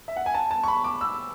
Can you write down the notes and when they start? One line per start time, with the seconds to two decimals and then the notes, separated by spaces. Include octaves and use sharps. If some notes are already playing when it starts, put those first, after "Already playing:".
0.08 E5
0.16 F#5
0.26 G#5
0.35 A5
0.51 A5
0.64 C#6
0.68 B5
0.84 D6
1.01 E6